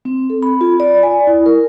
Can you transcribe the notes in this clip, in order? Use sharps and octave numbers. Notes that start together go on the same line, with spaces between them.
C4
A4
B5
F4
D5
G#5
E4
A#4